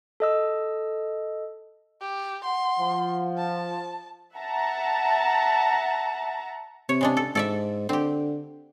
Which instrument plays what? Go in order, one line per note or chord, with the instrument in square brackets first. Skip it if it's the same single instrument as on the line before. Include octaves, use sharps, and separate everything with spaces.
[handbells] A4 D#5 E6
[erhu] G4
[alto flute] F#5 [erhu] C6
[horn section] F3
[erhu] A5
[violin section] E5 F#5 A5 A#5
[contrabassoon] C3 [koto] C#5
[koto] C#3 G#3 D4
A4
[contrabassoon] G#2 [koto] A4 D5 E5
[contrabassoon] D3 [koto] C4 G4